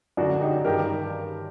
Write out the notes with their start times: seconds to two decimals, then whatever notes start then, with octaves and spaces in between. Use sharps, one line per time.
0.17 F#2 D3 D4 F#4
0.41 D#4 G4
0.65 G2 D#3 G4 A#4